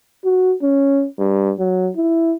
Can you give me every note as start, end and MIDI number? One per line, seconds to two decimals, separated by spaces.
0.24 0.54 66
0.62 1.06 61
1.19 1.52 43
1.59 1.90 54
1.96 2.35 64